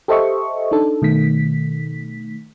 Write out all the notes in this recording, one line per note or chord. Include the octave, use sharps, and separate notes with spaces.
G4 A4 C5 D#5 E5 C#6
D4 D#4 A4
B2 D#3 A3 B6